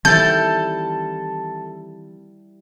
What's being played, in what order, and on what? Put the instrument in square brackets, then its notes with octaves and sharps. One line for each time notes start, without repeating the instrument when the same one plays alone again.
[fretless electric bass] D#3 E3 C4 [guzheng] G3 E4 [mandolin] A4 A5 [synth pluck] G6